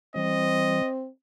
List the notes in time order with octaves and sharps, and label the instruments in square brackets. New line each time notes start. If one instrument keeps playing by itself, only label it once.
[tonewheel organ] E3 G3 [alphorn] C4 [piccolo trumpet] D#5